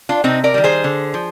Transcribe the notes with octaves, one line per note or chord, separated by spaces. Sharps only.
D4 F4
C3 C4 D#4
A#4 D5
D#3 G3
G#4 C5
D3
F3